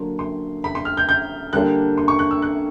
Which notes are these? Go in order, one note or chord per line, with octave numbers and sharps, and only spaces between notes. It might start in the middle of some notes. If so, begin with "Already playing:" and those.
Already playing: D3 F#3 A#3 D4 C6
C6
B5
C6
F6
G6
G6
D3 G3 A#3 D4 F#6
C6
C#6
F#6
E6
F#6